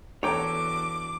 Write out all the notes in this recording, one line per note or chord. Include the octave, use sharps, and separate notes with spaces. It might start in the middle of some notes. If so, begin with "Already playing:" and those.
E2 D4 F#4 A4 C#5 G5 A#5 D6